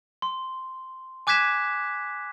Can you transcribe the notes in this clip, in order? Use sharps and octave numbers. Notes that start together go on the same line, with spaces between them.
C6
G#5 D6 F#6 G#6 B6 E7